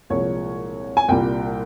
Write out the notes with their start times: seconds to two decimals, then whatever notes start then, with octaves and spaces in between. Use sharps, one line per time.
0.10 C2 A#2 F3 G#3 C#5
0.97 G#5
1.08 C2 A#2 G3 G5